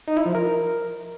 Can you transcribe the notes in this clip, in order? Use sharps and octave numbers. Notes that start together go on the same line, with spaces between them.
D#4
E4
F3
A#4